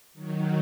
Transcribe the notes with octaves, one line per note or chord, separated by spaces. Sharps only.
D#3 F#3